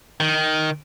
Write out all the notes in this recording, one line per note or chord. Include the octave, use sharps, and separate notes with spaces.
D#3